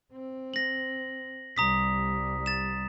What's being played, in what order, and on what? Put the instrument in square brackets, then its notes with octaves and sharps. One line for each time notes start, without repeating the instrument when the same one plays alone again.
[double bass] C4
[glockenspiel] A#6 F#7
[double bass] C2 G3 [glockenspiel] A#5 D#6 B6
[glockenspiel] A6 E7